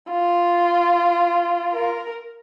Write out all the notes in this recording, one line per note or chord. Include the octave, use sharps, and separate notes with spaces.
F4
A#4